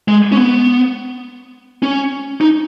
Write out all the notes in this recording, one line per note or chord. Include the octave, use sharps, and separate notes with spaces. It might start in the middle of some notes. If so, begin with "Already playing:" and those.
G#3
C#4
B3
C#4
D#4